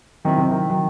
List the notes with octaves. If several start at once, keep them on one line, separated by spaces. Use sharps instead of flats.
D#3 F#3 C4 E4
C3
D#3
D#3 F#3